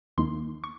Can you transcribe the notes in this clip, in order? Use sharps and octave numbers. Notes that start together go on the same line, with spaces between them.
D#2 D#3 A#3 D#4 C6
C#6